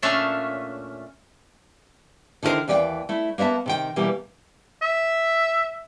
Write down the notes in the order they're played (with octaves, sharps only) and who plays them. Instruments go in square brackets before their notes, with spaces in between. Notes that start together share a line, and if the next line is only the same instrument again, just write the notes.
[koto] A#2 A3 C#4 D4 E5 F5
[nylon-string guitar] D3 D#3 E4 F4 A#4 C5
D#2 E3 D5 E5 G5
A3 E4
A#3 B3 D5 E5 A5
C3 D#3 G5
B2 E3 G3 A#3 G4
[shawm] E5